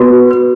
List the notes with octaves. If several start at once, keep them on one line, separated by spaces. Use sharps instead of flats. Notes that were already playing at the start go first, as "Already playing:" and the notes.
Already playing: B3 F#4
B4
B4